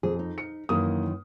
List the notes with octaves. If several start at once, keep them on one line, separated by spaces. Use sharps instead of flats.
F2 G#4
D#4
C#7
F#2 D#3 E3 A#3 D#6